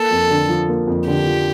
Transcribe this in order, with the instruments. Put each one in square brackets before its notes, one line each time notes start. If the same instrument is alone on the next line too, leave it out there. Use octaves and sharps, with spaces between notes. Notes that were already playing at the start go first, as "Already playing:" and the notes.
Already playing: [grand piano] A#3 [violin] A4
[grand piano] F2
D3
F3
A#3
F2
[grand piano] D3 [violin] G4
[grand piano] F3